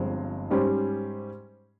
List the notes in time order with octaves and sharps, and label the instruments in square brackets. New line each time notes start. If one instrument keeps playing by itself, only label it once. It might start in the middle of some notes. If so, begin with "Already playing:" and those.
Already playing: [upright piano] G1 G2 F3 G#3 C4
G#2 G3 C#4 G4 C5